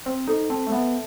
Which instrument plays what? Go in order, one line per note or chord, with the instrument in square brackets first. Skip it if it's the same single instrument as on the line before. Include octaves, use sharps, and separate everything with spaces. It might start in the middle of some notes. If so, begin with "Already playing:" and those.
[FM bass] C4 [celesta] C5
[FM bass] D#4 [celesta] A4
[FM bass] C4 [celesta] A5
[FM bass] A3
[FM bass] B3 [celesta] E5